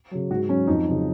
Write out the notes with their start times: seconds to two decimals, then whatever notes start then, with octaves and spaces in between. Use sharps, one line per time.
0.11 C#3 F#3
0.30 G#2 F#4
0.49 F#3 C#4
0.67 F2 D#4
0.86 C#3 F#3